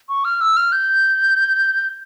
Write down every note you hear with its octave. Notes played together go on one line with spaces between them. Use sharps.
C#6
F6
E6
F6
G6